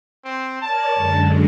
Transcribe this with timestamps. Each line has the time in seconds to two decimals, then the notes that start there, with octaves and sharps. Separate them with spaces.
0.25 C4
0.62 A#4 C#5 D5 A5
0.94 F#2 D3 G#3